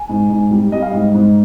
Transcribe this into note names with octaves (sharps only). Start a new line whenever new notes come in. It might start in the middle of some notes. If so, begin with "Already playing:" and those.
Already playing: G#5
G#2
G#2
G3
G3 D#5
F5
G#2 D#5
G#2